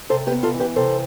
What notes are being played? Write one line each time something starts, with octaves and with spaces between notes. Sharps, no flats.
C3 A4 C5
G4 B4
B3
F4 A4
E3
G4 B4
C3 A4 C5